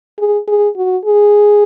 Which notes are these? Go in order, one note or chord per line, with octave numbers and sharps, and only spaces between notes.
G#4
G#4
F#4
G#4